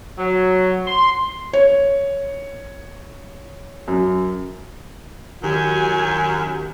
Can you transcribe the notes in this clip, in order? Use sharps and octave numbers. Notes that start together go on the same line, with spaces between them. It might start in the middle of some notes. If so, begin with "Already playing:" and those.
F#3
C6
C#5
F#2
F#2 D#3 F#4 G4 G#5